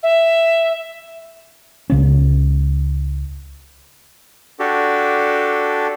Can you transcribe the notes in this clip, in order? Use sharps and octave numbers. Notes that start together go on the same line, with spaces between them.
E5
C#2 C#3 B3 C#4
D4 F#4 G4 A4